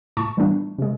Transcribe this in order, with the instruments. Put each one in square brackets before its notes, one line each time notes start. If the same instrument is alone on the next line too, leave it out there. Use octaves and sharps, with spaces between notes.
[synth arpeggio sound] A2 A5 C#6
E3 G3 A3 B3 D4
C3 G#3